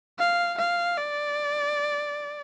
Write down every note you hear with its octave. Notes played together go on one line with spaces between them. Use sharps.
F5
F5
D5